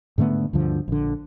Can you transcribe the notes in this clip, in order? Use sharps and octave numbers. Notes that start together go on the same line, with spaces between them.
G#2 D3 A3 B3
D2 G2 D3 F3
A#1 D3